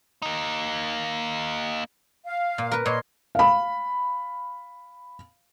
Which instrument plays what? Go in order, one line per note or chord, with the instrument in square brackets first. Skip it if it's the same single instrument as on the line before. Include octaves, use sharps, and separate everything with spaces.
[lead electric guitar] A#3 D#4
[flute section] F5
[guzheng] A#2
A#4 B4
[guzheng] A#2 C#5 [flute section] D#5 C6
[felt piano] F5 B5